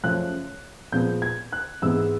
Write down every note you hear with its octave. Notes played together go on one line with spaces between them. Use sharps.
F#2 C#3 F3 A3 F#6
A#2 F3 G#3 B3 G6
G#6
F#6
G#2 E3 G#3 B3 E6